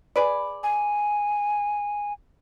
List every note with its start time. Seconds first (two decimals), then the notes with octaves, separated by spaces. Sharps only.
0.16 G#4 B4 D5
0.63 G#5